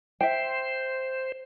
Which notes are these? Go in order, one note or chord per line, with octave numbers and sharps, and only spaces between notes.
C5 E5 G5